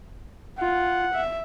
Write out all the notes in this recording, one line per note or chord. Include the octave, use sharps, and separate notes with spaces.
F4 F#5
E5